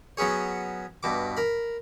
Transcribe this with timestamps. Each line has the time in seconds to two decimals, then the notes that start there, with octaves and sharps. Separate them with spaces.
0.17 F#3 B3 C#4 G#4 C#5
1.03 G2 B2 D6
1.37 A#4 B5